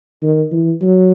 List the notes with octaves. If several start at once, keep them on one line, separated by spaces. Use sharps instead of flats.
D#3
E3
F#3